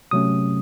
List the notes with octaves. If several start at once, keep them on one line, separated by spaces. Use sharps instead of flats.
C3 F#3 A3 C#4 D#6